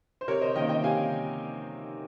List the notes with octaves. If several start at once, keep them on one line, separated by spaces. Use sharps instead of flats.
C5
C3 A#4 C#5
C5 D#5
D#3 A#3 C#4 D#5 G5
D#5 G5
C3 F5 G#5